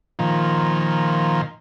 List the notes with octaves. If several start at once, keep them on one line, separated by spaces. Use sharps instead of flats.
A#2 D#3 F3